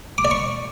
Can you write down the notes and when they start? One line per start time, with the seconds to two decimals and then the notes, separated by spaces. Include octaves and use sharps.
0.18 D6
0.25 D5
0.31 C#6